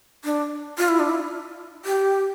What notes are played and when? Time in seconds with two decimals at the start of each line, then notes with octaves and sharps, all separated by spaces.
0.24 D4
0.78 F4
0.89 E4
0.99 D4
1.09 E4
1.85 G4